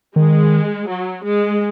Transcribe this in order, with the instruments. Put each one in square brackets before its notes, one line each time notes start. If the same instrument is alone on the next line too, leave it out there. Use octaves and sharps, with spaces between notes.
[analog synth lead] D#3 [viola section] G#3
[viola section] F#3
G#3